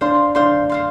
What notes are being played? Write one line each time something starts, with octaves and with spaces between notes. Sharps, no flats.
D4 C5 F5 C6
D4 C5 F5 C6
C5 F5 C6